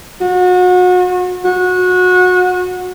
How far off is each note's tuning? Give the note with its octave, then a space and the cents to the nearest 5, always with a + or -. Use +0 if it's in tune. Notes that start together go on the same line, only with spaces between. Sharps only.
F#4 -35
F#4 -25